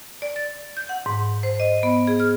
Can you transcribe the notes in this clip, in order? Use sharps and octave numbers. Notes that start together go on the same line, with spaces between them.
D5
A6
G6
F#5
G#2
C5
D#5
B3
G#4
F6